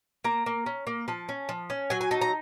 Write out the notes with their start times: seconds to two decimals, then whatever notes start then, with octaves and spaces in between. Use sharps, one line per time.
0.24 A#3 A#5
0.46 A#3
0.66 C#4
0.87 A#3
1.08 F3 A5
1.29 C#4
1.49 F3
1.70 C#4
1.90 F#3 G#5
2.01 G#5
2.11 D#4 A5
2.21 A#5